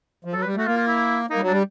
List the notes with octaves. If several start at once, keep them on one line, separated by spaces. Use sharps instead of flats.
F3
F#3 A4
G3 B4
A3 F#4
A#3 F4
F4
E4
A#3 D#4
G3
F#3
G3 D4